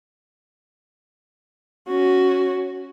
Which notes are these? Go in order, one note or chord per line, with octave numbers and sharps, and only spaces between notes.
C#4 F#4